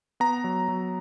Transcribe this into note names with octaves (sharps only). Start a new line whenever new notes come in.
B3 A#5
F#3
F#3